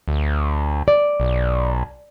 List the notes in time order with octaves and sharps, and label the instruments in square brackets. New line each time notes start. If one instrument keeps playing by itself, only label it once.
[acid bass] D2
[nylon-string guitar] D5
[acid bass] B1